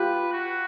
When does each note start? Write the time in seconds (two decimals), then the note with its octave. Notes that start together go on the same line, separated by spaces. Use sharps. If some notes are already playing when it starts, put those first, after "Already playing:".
Already playing: F4 G4 B4
0.33 F#4